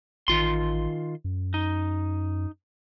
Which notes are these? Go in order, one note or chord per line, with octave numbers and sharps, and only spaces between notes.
A1 D#3 F4 C6
F#2
D#4